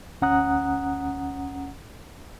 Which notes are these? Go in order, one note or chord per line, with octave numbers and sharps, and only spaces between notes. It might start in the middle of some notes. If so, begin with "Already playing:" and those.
D2 C#4 F#5 A#5 D#6 F#6